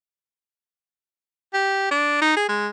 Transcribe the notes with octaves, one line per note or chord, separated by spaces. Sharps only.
G4
D4
D#4
G#4
G#3